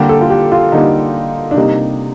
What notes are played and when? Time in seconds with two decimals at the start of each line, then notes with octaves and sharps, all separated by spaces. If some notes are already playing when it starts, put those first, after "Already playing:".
Already playing: D3 G3 A#3 G4
0.09 A4
0.21 F4
0.30 G4
0.52 F4
0.72 D3 G3 A#3 D#4
1.51 D4
1.56 C3 G3 A#3 D#4